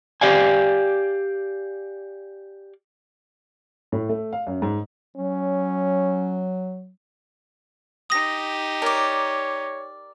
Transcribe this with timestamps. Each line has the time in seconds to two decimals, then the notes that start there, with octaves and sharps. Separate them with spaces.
0.21 G4 D5 F5 G#5
3.92 A2
4.09 A3
4.33 F5
4.47 F#2
4.62 G#2
5.16 F#3 C#4
8.10 D#4 G4 D#6 A#6
8.82 A#4 C#5 D5